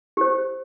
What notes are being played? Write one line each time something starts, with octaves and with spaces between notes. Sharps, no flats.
G4 C5